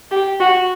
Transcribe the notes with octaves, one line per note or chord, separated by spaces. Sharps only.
G4
F#4